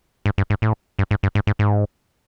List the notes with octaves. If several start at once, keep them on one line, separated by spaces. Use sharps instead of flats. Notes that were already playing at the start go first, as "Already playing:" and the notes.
G#2
G2
G#2
A2
G2
G#2
G2
G#2
G#2
G#2